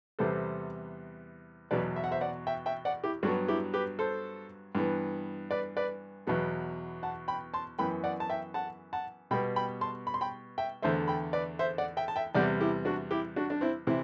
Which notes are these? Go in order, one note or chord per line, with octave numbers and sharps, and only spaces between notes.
E2 C3 G3 B3 A4 C5
E2 B2 F#3 B4 D5
E5
F#5
C5 E5
D5 F#5
E5 G5
E5 G5
D5 F#5
E4 G4
G2 F#3 B3 D4 F#4
E4 G4
G4 B4
A4 C5
G2 E3 B3
B4 D5
B4 D5
E2 B2 F#3 B3
F#5 A5
G5 B5
A5 C6
F#2 E3 B3 G5 B5
D5 F#5
A5
E5 G5
F#5 A5
F#5 A5
B2 G3 B3 G5 B5
G5 B5
A5 C6
B5
C6
G5 B5
E5 G5
E2 D3 A3 C5 E5
G5 B5
B4 D5
C5 E5
D5 F#5
E5 G5
A5
E5 G5
E2 C3 G3 B3 D5 F#5
E4 G4
D4 F#4
E4 G4
D4 F#4
D4
C4 E4
C3 E3 C4 E4